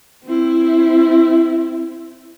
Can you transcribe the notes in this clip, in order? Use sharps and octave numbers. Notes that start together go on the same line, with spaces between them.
C4 E4